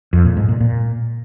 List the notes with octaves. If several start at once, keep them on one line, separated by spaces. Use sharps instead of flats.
F2
A#2
G#2
A#2
A#2